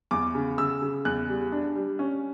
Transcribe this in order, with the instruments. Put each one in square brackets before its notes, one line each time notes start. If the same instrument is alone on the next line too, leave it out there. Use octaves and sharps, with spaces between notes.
[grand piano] E2 D6
C#3
C#3 E6
C#3
E2 F#6
G3
D4
G3
C#4